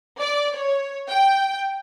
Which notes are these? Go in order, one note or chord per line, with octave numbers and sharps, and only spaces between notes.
D5
C#5
G5